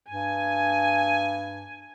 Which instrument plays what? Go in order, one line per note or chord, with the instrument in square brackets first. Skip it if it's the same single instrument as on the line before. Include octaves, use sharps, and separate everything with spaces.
[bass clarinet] G2 [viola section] G#5